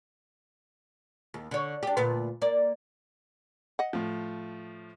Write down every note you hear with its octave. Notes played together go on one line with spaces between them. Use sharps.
D#2
D3 C#5
D4 G4
D2 A#2 B3
A#3 D5
D#5 F#5
A2 F3